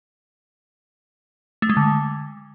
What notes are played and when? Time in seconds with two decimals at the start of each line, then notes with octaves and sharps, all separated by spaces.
1.62 A3
1.69 G#3
1.77 D3